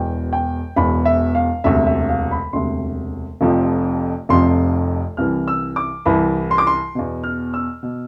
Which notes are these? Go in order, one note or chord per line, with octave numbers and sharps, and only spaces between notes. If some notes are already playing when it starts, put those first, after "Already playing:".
Already playing: E1 E2 B2 G5
G5
E1 E2 B2 B5
E5
F5
E1 D2 C3 E5
E5
F5
B5
E1 D2 C3 C6
F1 F2 C3 F3
F1 F2 C3 F3 C6
C2 C3 E3 F6
E6
D6
C2 C3 E3 B5
C6
D6
C6
E2 B2
F6
E6
B2